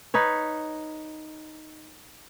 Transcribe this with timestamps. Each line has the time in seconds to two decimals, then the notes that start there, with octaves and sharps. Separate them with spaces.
0.14 D#4 B4 C#5